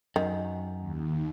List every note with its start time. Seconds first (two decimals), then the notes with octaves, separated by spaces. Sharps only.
0.16 F#2 D#3
0.79 D#2